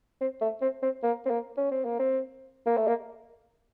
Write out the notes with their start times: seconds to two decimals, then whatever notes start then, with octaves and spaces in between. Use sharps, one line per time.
0.21 C4
0.41 A3
0.61 C4
0.82 C4
1.03 A#3
1.26 C4
1.30 A#3
1.57 C#4
1.71 C4
1.85 A#3
1.99 C4
2.66 A#3
2.77 A3
2.87 A#3